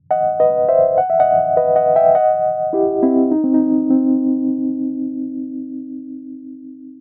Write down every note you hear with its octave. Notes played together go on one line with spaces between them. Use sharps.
D#5 F#5
B4 D#5
C5 E5
F#5
E5
D#5 F#5
B4 D#5
D#5 F#5
E5 G5
D#5 F#5
E4 G4
C4 E4
D#4
C4
D#4
C4